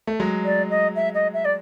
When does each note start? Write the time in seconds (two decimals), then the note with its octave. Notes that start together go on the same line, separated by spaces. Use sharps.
0.07 A3
0.20 F#3 G#3
0.45 D5
0.70 D#5
0.95 E5
1.14 D#5
1.33 E5
1.45 D5